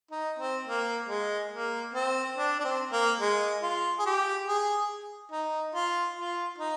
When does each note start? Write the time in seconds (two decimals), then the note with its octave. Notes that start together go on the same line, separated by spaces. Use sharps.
0.11 D#4
0.39 C4
0.67 A#3
1.09 G#3
1.52 A#3
1.94 C4
2.37 D4
2.60 D4
2.64 C4
2.92 A#3
3.21 G#3
3.62 F4
3.99 G#4
4.06 G4
4.48 G#4
5.32 D#4
5.75 F4
6.17 F4
6.58 D#4